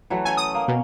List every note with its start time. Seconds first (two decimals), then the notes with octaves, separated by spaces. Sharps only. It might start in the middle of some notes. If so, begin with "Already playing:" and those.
0.10 E3 F#3 A3
0.25 A3 C#4 A4 G#5
0.37 D#6
0.54 A#3
0.68 B2 C#4